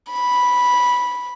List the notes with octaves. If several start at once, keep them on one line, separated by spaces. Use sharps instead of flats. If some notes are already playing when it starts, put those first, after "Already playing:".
B5